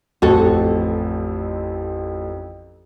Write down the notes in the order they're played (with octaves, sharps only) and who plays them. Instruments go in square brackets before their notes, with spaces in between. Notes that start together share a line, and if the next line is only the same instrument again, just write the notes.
[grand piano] A1 F2 C4 [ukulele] F#4 A4